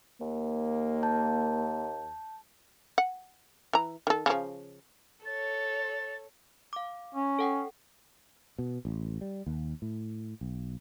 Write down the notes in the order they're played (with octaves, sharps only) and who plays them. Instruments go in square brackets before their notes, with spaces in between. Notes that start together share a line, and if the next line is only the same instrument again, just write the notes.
[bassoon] D#2 [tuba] A#3
[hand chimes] A5 G6
[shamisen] F#5
E3 A#5
D#3 A4
C#3 F3
[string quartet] A4 C#5 [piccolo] A6
[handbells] F5 D6
[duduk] C#4
[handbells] A4 F#5 G5
[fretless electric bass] B2
A1
G3
D#2
A2
B1